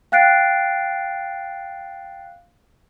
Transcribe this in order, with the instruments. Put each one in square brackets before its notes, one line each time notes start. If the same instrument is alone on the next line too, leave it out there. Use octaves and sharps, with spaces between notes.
[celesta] F5 G5 F#6 A6 C7 D7